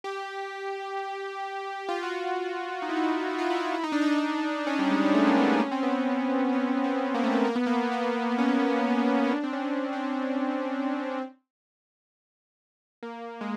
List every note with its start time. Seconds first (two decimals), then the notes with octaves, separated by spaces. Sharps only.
0.04 G4
1.89 F4
2.03 F#4
2.15 F4
2.82 D#4
2.89 E4
2.96 D#4
3.04 E4
3.13 D#4
3.29 F#4
3.38 F4
3.50 E4
3.60 F4
3.74 E4
3.83 D#4
3.92 D4
4.01 D#4
4.21 D#4
4.67 C#4
4.79 G3
4.90 G#3
5.06 G#3
5.14 A3
5.27 A#3
5.37 B3
5.61 C#4
5.71 C4
5.83 B3
5.94 C4
6.53 C#4
6.84 C4
7.15 A#3
7.23 A3
7.32 A#3
7.45 A#3
7.56 B3
7.66 A#3
7.92 B3
8.38 C#4
9.24 C#4
9.32 D4
9.44 C4
9.53 C#4
9.62 D4
9.93 C4
13.03 A#3
13.41 G#3